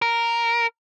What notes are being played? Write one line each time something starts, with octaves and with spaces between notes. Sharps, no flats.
A#4